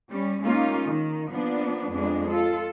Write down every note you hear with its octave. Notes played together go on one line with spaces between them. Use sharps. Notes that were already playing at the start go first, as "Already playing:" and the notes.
G3 C#4
G#3 A#3 C#4 D#4 F4
D#3
F3 A#3 B3 D4
F2 G#3 D4
F4 A4